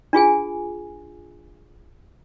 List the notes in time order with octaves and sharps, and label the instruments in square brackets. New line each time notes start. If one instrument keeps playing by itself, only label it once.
[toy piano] D4 F4 G#4 G#5